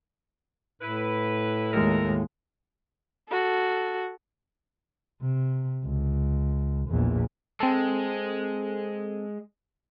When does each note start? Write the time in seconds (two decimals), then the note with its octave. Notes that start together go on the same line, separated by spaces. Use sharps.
0.82 A2 E4 B4
1.73 D#2 G#3 D#4 A4 A#4
3.29 F#4 A4
5.21 C3
5.84 C#2
6.89 A#1 E2
7.60 G#3 C4 A4